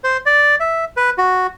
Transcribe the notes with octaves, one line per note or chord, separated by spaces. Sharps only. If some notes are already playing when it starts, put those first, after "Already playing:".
C5
D5
E5
B4
F#4